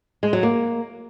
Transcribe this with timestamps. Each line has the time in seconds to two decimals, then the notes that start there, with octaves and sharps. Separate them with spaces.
0.23 G#3
0.33 F#3
0.43 A#3